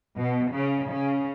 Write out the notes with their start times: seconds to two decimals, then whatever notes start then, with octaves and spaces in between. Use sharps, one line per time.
0.17 B2
0.52 C#3
0.89 C#3